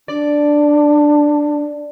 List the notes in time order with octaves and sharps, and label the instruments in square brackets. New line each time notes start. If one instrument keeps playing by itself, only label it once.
[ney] D4 [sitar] D5